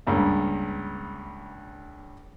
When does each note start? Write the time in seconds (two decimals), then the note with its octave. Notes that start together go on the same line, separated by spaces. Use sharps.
0.07 C#2 G2 A#3